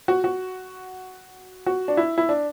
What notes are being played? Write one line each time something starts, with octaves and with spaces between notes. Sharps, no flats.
F#4
F#4
F#4
D4
E4
E4
D4